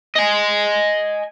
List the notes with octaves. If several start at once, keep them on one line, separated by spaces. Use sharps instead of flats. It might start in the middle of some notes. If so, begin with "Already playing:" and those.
D#5 G#5